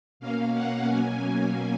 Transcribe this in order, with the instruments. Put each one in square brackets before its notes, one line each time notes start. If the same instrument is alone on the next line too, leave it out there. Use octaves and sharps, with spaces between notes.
[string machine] B2 A#3 C#4 F5
F#5
B2 F#3 A#3 C#4 G#5